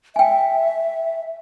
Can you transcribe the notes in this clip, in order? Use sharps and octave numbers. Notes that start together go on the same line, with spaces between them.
E5 G5 G#5